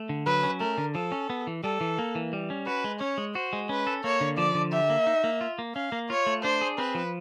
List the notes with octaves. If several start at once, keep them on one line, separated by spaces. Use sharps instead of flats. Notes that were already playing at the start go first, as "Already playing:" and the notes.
Already playing: A3
D3
F#3 B4
C#4
A3 A#4
D3
F3 A4
C#4
B3
E3
G3 A4
E3
A#3
E3
G3
C#4
F#4 B4
G#3
C#4 C#5
G#3
F#4 C5
G#3
C#4 B4
A4
A#3 C#5
D3
F3 D5
D3
G4 E5
A#3
D#4
A#3
F4
A#3
C#4 F5
A#3
F4 C#5
A3
D4 C5
G#4
C4 B4
F3